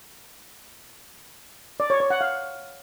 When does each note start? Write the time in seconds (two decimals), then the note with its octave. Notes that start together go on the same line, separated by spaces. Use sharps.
1.80 D5
1.90 C#5
2.00 C#5
2.10 F#5
2.21 F5